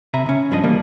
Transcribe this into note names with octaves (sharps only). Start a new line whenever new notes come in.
C3 E5 G#5 A#5 B5
C#3 C#4
G2 F3 D4 A#4 D#5
E3 F3 G3 A3 A#3